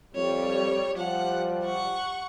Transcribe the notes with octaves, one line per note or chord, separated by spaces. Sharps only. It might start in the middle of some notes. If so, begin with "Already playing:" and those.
F2 G3 C#5
F3 G3 F#5
F#5 C#6